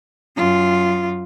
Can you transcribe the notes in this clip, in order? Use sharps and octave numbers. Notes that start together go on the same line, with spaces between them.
F#2 F4